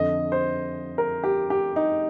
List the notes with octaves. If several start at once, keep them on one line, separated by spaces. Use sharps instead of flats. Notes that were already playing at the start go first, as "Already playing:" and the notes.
Already playing: F2 D3 D#5
C5
A#4
G4
G4
D#4